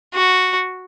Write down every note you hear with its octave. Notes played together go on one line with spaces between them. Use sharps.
F#4